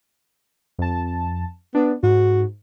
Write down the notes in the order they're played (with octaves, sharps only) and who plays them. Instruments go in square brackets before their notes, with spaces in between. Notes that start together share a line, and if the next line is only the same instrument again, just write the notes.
[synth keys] F2 A5
[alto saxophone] B3 [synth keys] D4
[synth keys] G#2 [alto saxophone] F#4